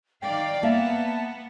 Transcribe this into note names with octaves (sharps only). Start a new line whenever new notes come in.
D#3 D5 F5 G5
A#3 B3 E5 F5 A5